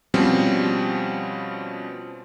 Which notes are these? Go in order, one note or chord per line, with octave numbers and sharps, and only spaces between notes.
B2 F3 G3 C4 C#4